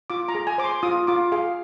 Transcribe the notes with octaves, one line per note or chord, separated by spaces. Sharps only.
F4 D6
A#5
G#4
G#5
C5 D6
C6
F4 D#6
F4 D6
G#4 F5